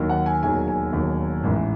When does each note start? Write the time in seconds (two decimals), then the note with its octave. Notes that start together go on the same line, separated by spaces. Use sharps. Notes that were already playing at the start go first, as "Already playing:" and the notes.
Already playing: D#2 D#3 F#3
0.09 F#5
0.26 G#5
0.43 E1 D#2 D#3 F#3 G#5
0.68 G#5
0.92 E1 D#2 D#3 F#3
1.43 A1 G#2 E3